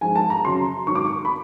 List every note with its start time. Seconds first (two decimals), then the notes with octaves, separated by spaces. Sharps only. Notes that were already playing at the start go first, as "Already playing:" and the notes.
0.01 G#2 F3 G#3 G#5
0.16 A5
0.30 A#5
0.45 F#2 C#3 F#3 C6
0.87 G#2 D#3 F#3 C#6
0.95 D6
1.05 C#6
1.25 B5